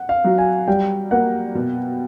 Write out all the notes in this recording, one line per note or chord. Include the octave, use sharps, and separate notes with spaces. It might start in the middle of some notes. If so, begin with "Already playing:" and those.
Already playing: F#5
F5
F#3
G#5
G3 G5
A#3 F#5
B2